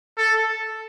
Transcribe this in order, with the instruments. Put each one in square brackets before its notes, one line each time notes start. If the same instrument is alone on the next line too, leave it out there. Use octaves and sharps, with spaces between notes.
[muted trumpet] A4